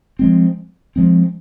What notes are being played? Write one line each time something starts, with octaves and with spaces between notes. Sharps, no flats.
F3 G#3 C4
F3 G#3 C4